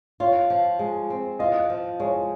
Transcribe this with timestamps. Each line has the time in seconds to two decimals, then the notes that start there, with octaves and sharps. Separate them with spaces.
0.20 F4 C#5
0.50 F3
0.79 G#3
1.10 C4
1.39 F4 D#5
1.70 F3
2.00 G#3 C#5